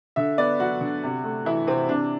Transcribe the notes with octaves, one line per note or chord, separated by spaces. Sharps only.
D3 E5
B3 D5
F#3 F#4
D3
C3
A3
E3 E4
C3 C4
C3 D4